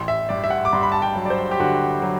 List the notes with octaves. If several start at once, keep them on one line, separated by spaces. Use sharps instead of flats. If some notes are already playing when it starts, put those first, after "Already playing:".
Already playing: A1 C6
E5
G2 D5
E5
F#5
D6
G2 C6
B5
A5
G5
F#3
D5
C5
G4
D3 F#4
F#3